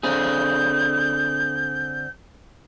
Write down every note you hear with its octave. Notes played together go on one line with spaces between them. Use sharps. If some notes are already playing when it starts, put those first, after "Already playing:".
D3 C4 G#4 G6